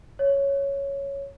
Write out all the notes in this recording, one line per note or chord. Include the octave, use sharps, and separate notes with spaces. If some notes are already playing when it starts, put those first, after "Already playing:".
C#5